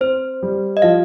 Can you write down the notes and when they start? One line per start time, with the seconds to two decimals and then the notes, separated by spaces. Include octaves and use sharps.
0.01 C4 C5
0.43 G3
0.77 D#5
0.82 F3 F5